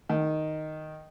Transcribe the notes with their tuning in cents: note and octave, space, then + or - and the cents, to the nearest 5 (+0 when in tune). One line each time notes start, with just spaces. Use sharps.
D#3 -5